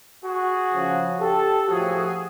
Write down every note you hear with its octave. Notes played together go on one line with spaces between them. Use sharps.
F#4 G#4
C#3 F3
G4 A4
A2 F3 F#4 G#4